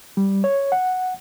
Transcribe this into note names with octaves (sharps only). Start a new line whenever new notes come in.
G3
C#5
F#5